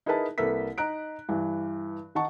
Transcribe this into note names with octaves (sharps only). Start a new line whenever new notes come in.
D#4 E4 G#4 A#4 B4 A5
C2 A#3 A4 B4 E5 B6
D#4 A#5 F#6 D7
G2 E3
D#3 D#4 F#5 A5 C#6